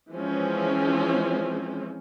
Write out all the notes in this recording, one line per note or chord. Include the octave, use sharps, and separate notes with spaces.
E3 F3 G#3 C4 C#4